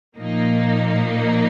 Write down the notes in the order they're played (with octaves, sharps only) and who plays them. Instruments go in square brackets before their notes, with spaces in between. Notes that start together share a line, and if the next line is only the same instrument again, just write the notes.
[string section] A#2 F3 A#3 D#4